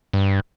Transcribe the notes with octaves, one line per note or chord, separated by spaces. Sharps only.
G2